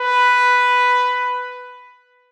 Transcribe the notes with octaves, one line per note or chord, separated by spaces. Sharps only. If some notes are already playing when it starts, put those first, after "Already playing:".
Already playing: B4